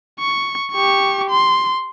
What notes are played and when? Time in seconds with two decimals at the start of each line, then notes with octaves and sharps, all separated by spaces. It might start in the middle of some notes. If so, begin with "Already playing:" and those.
0.19 C#6
0.72 G4 C#6
1.30 C6